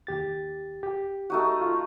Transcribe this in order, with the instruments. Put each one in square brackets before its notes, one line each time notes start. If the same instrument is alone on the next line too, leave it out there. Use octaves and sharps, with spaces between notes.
[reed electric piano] D#2 G4 A6
G4
[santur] A3 D#4 F#4
[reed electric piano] F4